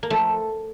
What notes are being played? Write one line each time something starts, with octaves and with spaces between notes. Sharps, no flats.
A#3
F3 A3